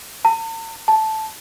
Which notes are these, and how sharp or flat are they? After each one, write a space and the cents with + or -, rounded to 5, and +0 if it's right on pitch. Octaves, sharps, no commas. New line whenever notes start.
A5 +45
A5 -10